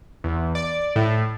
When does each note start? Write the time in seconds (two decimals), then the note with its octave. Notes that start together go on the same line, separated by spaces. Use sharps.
0.24 E2
0.55 D5
0.96 A2